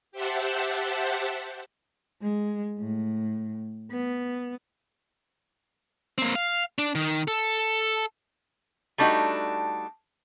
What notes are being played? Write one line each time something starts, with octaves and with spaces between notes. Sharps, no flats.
G4 C5 E5 F#5 A5
G#3
A2
B3
A#3 C4
F5
D4
D#3
A4
G3 A3 D4 D#4 F#4